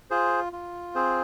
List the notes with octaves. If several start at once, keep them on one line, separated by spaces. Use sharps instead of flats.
F4 G#4 C5
F4
C4 G#4 C5